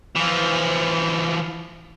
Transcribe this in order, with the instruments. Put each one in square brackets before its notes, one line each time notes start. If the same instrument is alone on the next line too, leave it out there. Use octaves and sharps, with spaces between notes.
[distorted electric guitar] E3 F3